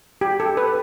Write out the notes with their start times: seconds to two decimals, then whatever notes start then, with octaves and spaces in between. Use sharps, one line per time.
0.21 G4
0.40 A4
0.57 B4